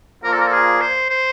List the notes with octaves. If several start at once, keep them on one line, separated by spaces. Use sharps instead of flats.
A#2 F3 A#3 A#4
A4
A#4
A4
G#4
C5
C5